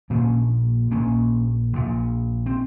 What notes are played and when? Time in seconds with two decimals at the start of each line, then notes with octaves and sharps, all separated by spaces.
0.10 A#1 A#2 A#3 C#4
0.91 A#1 A#2 A#3 C#4
1.73 A#1 A#2
2.46 C4